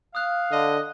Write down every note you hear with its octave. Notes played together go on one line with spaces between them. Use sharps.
F5 D#6 F#6
D3 D#5